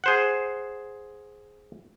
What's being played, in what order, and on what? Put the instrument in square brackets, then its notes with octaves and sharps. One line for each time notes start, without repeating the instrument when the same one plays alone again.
[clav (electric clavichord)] G#4 C5 F#5